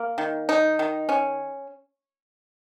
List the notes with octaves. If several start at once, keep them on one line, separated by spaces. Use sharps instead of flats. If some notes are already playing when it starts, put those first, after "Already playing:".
Already playing: A#3
D#3
D#4
D#3
C#4